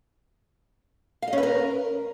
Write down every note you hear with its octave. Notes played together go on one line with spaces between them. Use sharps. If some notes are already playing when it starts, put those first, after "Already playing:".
F5
D#5
C#4
B4
A#4